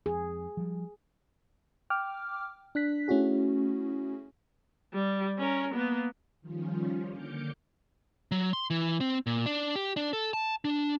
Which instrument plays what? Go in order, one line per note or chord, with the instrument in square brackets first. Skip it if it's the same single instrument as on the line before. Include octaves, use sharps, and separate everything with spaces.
[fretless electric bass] F2 [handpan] G#4
[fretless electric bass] F3 G3
[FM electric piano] G5 D6 F6
D4 F#6 B6
A3 C#4 E4 F#4 G#4
[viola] G3
C#4 A#4
A#3 B3
[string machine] D#3 F3 G3 C#4 F4
D3 A#3 D6 F6 G6 C#7
[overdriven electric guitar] F#3
C6
E3
C4
A#2
D4
G4
D4
A4
A5
D4